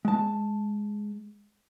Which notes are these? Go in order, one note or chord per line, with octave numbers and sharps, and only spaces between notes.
G#3 A5